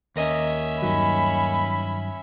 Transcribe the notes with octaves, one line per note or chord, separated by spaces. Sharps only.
D#2 C#4 A#4 D#5 E5
G2 D#3 F#3 B5